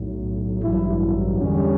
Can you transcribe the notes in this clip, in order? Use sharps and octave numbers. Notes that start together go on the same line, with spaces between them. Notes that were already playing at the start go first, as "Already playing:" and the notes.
Already playing: B1 A2 F#3
A1 G2 F#3 E4
E2 D3 G3 C#4